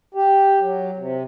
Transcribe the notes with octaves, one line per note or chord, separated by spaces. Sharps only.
G4
F#3
C3